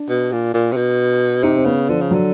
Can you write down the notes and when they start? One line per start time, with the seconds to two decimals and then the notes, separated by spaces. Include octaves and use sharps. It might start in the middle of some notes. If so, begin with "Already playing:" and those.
Already playing: D4
0.09 B2
0.32 A#2
0.54 A#2
0.72 C3
0.77 B2
1.43 C3 D#4
1.57 C4
1.65 C#3 B3
1.89 D3 F3
2.01 C#3
2.11 D3 F#3